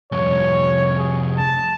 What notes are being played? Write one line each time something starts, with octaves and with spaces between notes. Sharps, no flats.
C2 F2 C#5
G#4
A5